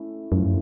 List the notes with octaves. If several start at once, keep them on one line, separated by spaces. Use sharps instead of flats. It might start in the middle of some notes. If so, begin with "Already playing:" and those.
Already playing: A3 C#4 E4
F#2 F3 A3 C#4 E4